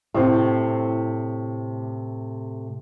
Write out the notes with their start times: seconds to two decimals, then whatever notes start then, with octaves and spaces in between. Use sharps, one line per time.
0.14 A2 C3